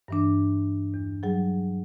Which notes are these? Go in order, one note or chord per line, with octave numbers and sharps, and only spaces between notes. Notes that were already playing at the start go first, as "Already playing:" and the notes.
G2 E3 D4
E2
F#3 G3 G#4